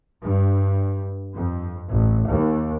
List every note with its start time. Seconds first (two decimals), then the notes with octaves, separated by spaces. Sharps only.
0.23 G2
1.34 F2
1.90 A1
2.31 D#2